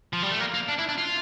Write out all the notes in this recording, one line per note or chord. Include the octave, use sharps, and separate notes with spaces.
F3
G3
A3
A#3
A#3
D4
E4
D4
F4